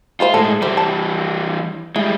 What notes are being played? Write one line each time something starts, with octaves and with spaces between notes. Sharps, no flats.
G#3 E4 F4 C5
A2 G#3 A4
E3 G3 E4 C5
A5
G3 G#3 E4